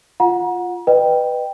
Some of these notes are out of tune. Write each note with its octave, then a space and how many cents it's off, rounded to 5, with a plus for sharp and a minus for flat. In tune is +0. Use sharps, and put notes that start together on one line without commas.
F4 +0 F#5 -25 A#5 +35
B4 +0 D#5 -35 G5 +0